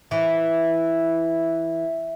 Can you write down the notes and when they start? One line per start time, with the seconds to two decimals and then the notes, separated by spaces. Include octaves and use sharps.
0.11 E3 E5